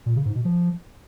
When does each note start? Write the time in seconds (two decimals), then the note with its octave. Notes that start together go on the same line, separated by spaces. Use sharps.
0.06 A#2
0.16 C#3
0.25 G#2
0.35 B2
0.45 F3